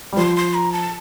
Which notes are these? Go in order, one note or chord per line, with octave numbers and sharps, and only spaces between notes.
G3
F3 C6
C6
A#5
A5